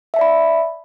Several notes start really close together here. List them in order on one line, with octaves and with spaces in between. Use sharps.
E5 A5 D5 B5